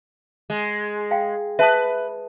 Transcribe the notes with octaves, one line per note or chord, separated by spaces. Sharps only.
G#3
F5 G5
B4 E5 A5 D#6